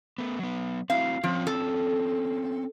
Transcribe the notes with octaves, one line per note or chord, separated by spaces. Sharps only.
A3 B3
F#3 B3
C4 E4 F#4 F5
F3 C4 C#4 F4
A4